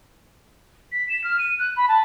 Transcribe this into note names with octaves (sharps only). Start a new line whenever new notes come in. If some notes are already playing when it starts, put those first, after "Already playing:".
B6
E7
F6
D#7
F#6
B5
A5